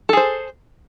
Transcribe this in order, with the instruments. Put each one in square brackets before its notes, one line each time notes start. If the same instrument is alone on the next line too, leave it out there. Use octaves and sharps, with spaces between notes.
[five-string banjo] A4
G#4
C5